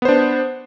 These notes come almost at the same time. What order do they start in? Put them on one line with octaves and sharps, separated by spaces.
B3 C5 D4